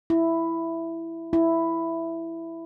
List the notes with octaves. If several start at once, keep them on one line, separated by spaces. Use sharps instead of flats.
E4
E4